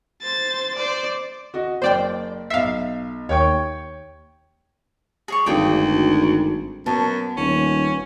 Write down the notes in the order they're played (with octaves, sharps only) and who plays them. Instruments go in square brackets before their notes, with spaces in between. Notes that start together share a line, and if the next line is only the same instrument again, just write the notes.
[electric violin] C5 A6
C5 D5
[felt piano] F#4 D#5
[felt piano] F#1 [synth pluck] C5 D5 G5
[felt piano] B1 C7 [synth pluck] E5 F5
[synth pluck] D#2 [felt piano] C#5 G5 C#6
[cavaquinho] G#4 C#5 C#6
[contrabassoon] G#1 [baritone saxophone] D2 [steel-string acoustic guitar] G2 [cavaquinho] G#4 G5 D6
[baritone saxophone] F#2 [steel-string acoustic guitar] B3 [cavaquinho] A5
[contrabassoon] D#1 [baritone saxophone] C#4